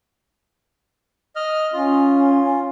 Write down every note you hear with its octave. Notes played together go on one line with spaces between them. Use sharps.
D#5 F6
C#4 F4